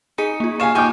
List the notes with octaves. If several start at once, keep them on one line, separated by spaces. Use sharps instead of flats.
D#4 G#4 G#5 C#7
A#3 F4
C#5 F5 G#5 E7
D#4 C#5 G5 G#5 D6